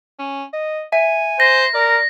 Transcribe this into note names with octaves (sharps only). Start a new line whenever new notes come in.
C#4
D#5
E5 G#5
C5 A#6
A#4 D5